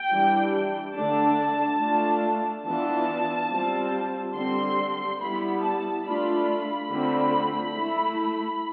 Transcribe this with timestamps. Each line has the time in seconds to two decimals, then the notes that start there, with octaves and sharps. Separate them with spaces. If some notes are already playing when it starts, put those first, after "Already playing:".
Already playing: G5
0.11 E3 G3 D4
0.95 D3 A3 D4 A5
1.80 A3 D4 F4
2.65 E3 B3 D4 F4 A5
3.51 G3 C4 F4
4.35 D3 G3 C4 C6
5.20 G3 B3 E4 B5
5.63 A5
6.05 A3 D4 F4 B5
6.90 D3 A3 C4 F4
7.76 A3 E4